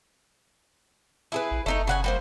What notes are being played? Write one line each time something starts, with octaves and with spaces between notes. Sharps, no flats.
E4 G#4 B4
A#1
F#1 A3 D#4 A#5
C#3 F#5 G#5
G3 A#3 C5